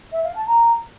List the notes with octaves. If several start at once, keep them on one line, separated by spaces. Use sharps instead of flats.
E5
F5
A5
A#5